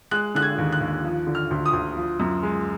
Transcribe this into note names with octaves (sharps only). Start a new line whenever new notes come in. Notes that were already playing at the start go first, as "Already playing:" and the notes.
G#3 F#6
D3 F#6
G#6
D#2
F#6
D#2
F3
D3
F6
D2
D#6
D2
F3
F#2
G#3